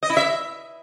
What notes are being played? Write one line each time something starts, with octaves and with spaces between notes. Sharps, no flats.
D#5
E4
E5